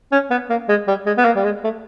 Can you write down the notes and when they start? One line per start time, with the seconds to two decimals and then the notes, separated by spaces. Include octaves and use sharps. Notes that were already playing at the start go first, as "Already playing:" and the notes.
0.12 C#4
0.30 B3
0.50 A#3
0.69 G#3
0.88 G3
1.06 G#3
1.18 B3
1.25 A#3
1.36 G3
1.44 G#3
1.64 A3